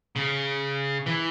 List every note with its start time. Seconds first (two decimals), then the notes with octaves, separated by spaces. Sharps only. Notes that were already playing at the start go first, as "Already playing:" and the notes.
0.16 C#3
1.06 E3